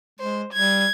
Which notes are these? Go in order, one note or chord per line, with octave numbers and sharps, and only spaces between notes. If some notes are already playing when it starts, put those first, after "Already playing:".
G#3 C5
G3 G#6